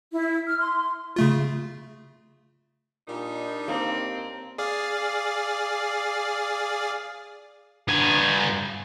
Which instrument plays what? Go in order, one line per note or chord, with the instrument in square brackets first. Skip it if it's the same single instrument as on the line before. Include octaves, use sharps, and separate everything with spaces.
[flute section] E4
F6
C6
[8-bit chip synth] C#3 A3 F4
[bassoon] A#2 [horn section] G3 D4 D#4
[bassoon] D#2 [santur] A#3 [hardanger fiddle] C4
[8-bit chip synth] G#4 D5 F5
[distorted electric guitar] G2 G#5